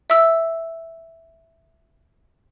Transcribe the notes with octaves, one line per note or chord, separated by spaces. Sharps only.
E5 E6